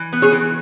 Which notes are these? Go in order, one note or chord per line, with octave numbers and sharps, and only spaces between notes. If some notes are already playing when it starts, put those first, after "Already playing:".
Already playing: E3
B3
G#4 C#5
E3